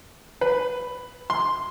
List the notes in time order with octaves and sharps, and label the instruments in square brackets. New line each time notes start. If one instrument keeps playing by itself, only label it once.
[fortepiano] B4
C6